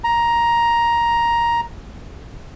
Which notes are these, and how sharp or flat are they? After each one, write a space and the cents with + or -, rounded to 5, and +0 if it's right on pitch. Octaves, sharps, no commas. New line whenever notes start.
A#5 +10